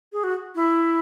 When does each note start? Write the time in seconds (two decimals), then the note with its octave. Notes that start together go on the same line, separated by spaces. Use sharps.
0.13 G#4
0.24 F#4
0.55 E4